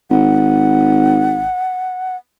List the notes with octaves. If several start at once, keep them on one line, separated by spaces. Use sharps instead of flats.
G#1 F#5